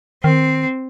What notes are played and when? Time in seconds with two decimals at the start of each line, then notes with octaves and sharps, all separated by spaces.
0.24 D#3 C4